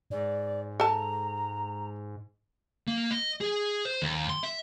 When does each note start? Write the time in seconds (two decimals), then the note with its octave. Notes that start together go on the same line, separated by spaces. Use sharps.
0.10 G#2 D5
0.80 A4 A5 A#5
2.88 A#3
3.11 D#5
3.41 G#4
3.85 C5
4.02 D#2
4.29 C6
4.43 E5